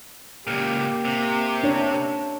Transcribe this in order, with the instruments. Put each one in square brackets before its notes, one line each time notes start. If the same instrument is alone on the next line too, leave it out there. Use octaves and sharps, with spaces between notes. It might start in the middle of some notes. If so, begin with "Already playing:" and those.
[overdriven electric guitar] C#2 A#2 [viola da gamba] A#3 [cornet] G4
[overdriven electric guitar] C3
[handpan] D4 C#5